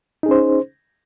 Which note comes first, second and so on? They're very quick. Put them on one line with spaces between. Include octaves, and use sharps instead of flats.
D#4 G#4 C#4 C5